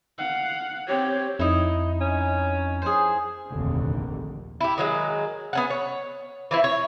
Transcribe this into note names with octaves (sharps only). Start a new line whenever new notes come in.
F5 F#5
C4 G4 C#5
F2 D#4 E4
C#4
G#4 C5
F1 A#1 D#2 D3
E4 G4
D#3 F#3 G#3
B3 C#4 F#5
C#5
E3 F3 E4
C#5